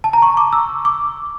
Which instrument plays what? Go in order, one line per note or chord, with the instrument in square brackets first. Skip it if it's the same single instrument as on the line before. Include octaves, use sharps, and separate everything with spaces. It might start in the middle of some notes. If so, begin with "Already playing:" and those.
[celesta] A5
A#5
C#6
D6
E6
D6